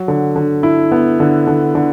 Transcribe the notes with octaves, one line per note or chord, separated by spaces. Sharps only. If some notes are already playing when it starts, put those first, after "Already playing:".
Already playing: F#3
D3
D3
E4
B3
D3
D3
D3